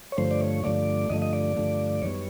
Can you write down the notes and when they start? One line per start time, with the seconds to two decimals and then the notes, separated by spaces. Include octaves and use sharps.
0.12 C#5
0.18 G2 D3 F3 A3 C5
0.31 D5
0.41 C#5
0.64 G2 D3 F3 A3 D5
1.10 G2 D3 F3 A3 D#5
1.22 D#5
1.33 D5
1.57 G2 D3 F3 A3
2.02 F#2 D#3 G3 B3 C#5